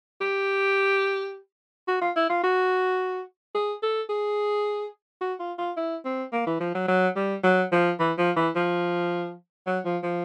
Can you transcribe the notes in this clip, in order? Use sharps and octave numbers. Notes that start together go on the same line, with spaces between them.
G4
F#4
F4
E4
F4
F#4
G#4
A4
G#4
F#4
F4
F4
E4
C4
A#3
E3
F3
F#3
F#3
G3
F#3
F3
E3
F3
E3
F3
F#3
F3
F3